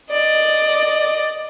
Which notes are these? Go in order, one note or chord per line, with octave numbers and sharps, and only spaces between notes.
D5 D#5